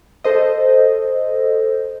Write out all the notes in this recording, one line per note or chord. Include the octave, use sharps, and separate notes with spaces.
A4 C5 D#5